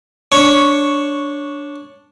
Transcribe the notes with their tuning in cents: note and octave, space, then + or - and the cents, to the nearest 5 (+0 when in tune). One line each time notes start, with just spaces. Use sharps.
D4 -10 C#5 +0 C#6 +5